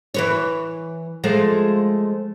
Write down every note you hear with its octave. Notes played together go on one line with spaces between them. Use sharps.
E3 B4 C#5
F3 G#3 A3